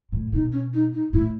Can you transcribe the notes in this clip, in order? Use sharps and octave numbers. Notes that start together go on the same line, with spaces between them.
A2
B2 D#4
C#4
D#4
D#4
A2 E4